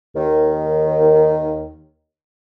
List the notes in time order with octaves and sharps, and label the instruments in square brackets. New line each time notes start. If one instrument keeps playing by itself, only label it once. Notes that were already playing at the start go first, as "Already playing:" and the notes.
[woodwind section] D#2 D#3